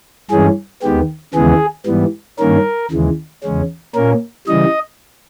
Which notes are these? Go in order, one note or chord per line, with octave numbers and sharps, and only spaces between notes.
G2 E3 G#3 C#4 G#4
D#2 D#3 G#3 B3 G4
D#2 C#3 E3 G#3 B3 G#4
G#2 E3 G3 B3
G2 D#3 A#3 C#4 A#4
D#2 C#3 E3 G#3
E2 C#3 G#3 C#4
A#2 A#3 C#4 A#4
C#3 E3 G3 D#5